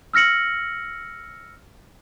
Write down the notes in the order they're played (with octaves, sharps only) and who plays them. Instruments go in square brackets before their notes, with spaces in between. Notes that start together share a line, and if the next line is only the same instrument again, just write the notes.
[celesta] E6 F6 A#6 C#7 F#7